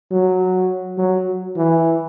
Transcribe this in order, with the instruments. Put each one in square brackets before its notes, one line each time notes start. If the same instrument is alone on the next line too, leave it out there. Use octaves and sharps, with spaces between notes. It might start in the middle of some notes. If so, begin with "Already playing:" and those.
[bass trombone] F#3
F#3
E3